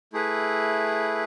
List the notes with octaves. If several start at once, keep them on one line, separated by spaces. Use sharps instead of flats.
A3 E4 G#4 B4